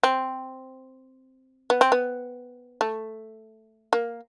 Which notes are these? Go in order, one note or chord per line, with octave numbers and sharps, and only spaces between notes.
C4
B3
C4
B3
A3
A#3